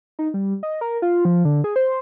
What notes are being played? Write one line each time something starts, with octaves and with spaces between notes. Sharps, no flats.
D#4
G3
D#5
A#4
F4
F3
D3
G#4
C5